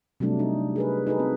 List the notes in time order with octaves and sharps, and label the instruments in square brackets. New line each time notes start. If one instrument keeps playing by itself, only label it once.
[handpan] C3 F#3 G3 A3 D4
D#4
G#4 A#4 B4
D#4 F#4 G#4 A4 B4
C4